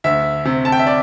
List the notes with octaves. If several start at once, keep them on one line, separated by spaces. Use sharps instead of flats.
D2 E5
C3
A5
G5
E5
D5